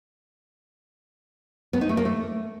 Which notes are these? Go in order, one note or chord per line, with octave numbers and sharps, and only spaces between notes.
B3
D#4
A3
A#3
A3